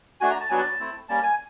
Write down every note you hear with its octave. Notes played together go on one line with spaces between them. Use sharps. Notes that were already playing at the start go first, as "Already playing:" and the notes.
A3 D4 F#4 G#5
A#5
A5
F#3 B3 D4 F#4 G#5
A5
A3 C4 E4
G3 A#3 C#4 A5
G#5